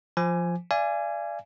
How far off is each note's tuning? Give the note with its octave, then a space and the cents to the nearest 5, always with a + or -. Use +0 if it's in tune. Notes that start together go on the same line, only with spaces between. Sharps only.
F3 +0 C5 +0 G#5 +5
D5 +0 F5 -45 G#5 +0